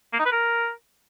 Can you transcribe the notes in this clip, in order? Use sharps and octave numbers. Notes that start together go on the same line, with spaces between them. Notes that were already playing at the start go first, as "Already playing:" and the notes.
A#3
D#4
B4
A#4